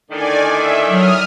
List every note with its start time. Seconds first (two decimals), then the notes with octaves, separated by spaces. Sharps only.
0.11 A2 D3 D#3 D5 G#5
0.52 E5
0.88 F#3 D#6 F6